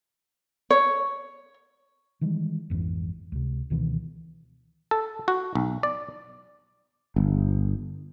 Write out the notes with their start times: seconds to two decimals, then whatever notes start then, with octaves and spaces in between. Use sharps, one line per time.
0.70 C#5
2.21 D#3 E3 G3 G#3
2.70 A#1 F2 G#2 E3
3.32 C#2 C3
3.70 C#2 B2 D#3 E3
4.91 A4
5.28 F#4
5.55 B1
5.83 D5
7.16 G1